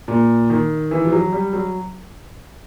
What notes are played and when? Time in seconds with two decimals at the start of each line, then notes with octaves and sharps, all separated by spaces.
0.08 A#2
0.50 D#3
0.91 E3
1.05 F3
1.12 F#3
1.32 G3
1.53 F#3